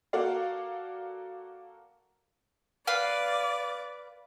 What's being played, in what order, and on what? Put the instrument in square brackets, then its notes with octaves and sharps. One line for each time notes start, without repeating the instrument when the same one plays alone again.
[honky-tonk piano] A#3 F#4 A4 A#4 D5 F5
[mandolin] B4 F5 [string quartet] D5